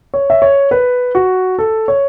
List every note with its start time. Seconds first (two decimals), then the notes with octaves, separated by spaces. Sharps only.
0.14 C#5
0.30 E5
0.42 C#5
0.71 B4
1.15 F#4
1.59 A4
1.88 C#5